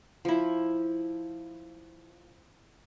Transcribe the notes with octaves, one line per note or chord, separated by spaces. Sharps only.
F3 E4